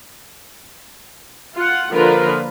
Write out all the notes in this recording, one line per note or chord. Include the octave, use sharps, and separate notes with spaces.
F4 F#5
D3 F3 A#3 F4 A#4 B4